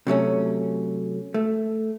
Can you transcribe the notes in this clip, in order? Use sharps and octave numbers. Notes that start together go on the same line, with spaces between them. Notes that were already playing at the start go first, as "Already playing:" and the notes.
C3 F#3 A3 C#4
A3